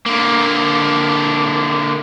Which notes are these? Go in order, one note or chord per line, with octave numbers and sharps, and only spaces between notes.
D3 A#3